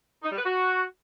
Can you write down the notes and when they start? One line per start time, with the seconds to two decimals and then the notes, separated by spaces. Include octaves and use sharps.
0.23 D#4
0.31 G3
0.38 B4
0.45 F#4